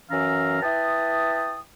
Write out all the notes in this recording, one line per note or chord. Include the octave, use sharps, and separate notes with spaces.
F#2 E3 C#4 F5 A#5 E6
E4 B4 G5 A5 D#6